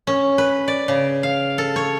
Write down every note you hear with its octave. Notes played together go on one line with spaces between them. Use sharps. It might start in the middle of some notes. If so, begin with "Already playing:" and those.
C#4
B4
D5
C#3
F5
A4
C#5